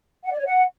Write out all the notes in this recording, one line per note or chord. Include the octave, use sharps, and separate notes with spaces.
F#5
D5
C#5
F#5